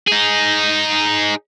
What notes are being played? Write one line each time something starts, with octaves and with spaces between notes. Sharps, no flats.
D#4 G#4